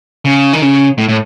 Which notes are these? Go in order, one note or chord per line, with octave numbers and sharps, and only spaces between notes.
C#3
D#3
C#3
A2
A2